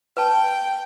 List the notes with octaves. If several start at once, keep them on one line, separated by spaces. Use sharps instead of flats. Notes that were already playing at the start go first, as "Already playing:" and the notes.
B4 G5 A5